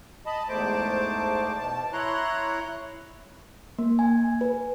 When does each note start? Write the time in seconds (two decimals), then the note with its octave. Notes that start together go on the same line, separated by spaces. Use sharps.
0.26 D#5 A5 B5
0.49 E2 G#2 A3 C5 A5 D6
1.58 B2 A5
1.93 E4 C#5 A#5 C6 F#6
3.79 A#3
3.99 G#5
4.41 B4